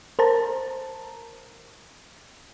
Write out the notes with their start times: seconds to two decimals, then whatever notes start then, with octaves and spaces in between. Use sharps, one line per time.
0.19 A#4 C5 A5 A#5